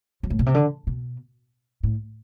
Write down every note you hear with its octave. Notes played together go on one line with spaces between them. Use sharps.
F#3
A2
B2
C3
D3
B2
A2